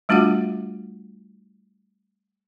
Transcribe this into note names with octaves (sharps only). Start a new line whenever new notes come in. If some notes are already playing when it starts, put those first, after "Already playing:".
G3 A3 D4 F4 F#4 F#5